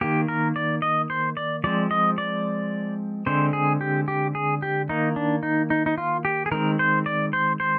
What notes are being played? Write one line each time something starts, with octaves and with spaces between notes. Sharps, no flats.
D#3 A#3 G4
A#4
D5
D#5
C5
D5
F3 G#3 C4 D5
D#5
D5
D3 G#3 C4 C5
G#4
G4
G4
G#4
G4
D#3 A#3 D#4
D4
D#4
D#4
D#4
F4
G4
G#4
D#3 G#3 C4 A#4
C5
D5
C5
C5